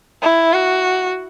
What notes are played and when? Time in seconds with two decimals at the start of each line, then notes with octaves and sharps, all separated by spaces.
0.22 E4
0.53 F#4